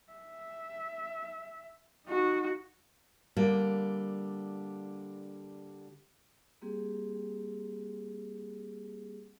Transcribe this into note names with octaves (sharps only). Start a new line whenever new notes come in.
E5
D#4 F#4
D3 G3 A#3
G3 A#3 C4 G4 G#4